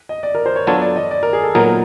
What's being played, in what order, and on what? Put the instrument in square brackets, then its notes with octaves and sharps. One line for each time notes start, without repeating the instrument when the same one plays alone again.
[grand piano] D#5
D5
A#4
C5
C#5
[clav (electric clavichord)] F#3 B3 D4 F4 A4 [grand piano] C#5
[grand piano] D5
D#5
D5
A#4
G#4
A4
[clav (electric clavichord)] A#2 F#3 B3 D#4 [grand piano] A#4